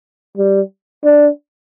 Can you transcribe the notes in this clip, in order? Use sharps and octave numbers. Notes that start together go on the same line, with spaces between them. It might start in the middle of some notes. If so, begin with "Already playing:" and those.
G3
D4